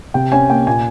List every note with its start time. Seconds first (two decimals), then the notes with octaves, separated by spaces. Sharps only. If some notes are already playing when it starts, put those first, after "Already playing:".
0.14 C3 G5
0.32 C#4 G#5
0.49 A#3 G5
0.67 A#2 G#5